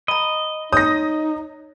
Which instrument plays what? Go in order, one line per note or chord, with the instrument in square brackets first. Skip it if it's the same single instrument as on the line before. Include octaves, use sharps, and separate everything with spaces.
[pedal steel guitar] D#5 [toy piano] A#5 B5
[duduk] D#4 [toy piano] C#5 [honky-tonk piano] D#6 A#6